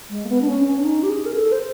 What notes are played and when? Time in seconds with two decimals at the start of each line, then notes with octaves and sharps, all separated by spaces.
0.10 G#3
0.25 A#3
0.29 B3
0.41 D4
0.48 C#4
0.67 C#4
0.78 D4
0.85 D#4
1.03 G4
1.09 G#4
1.26 A#4
1.34 A4
1.52 C5